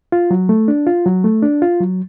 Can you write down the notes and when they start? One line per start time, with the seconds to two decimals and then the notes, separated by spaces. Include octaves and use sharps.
0.12 F4
0.31 F#3
0.49 A3
0.68 D4
0.87 F4
1.06 F#3
1.24 A3
1.42 D4
1.62 F4
1.80 F#3